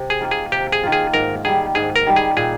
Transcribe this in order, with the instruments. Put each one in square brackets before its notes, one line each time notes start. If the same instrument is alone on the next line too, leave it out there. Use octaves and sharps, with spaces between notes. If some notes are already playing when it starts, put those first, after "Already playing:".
Already playing: [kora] C3
[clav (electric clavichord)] G#4
[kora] D#3 A#3 F4
[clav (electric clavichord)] G#4
[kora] C3 [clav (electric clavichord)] G4
[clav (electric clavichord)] G#4
[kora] D#3 A#3 F4
[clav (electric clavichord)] G#4
[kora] G#2 [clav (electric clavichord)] A#4
[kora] D#3 G3 [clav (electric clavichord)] G#4
[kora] G#2 [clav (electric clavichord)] G#4
[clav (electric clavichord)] A#4
[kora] D#3 G3
[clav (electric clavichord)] G#4
[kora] A#2 [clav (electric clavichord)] G#4